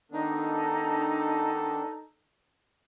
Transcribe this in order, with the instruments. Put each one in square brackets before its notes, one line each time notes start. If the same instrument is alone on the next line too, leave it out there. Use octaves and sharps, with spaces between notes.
[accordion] D#3 B3 D4 [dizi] D#4 [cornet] A4